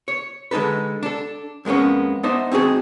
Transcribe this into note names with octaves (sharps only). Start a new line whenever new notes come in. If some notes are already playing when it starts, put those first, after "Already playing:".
C#5
D3 G#3 D#4 A4 B4
D4 A4
F2 G#3 A#3 B3 C#4
B3 D4 D#4 C5 D#5 E5
C4 D#4 F#4 G#4 A5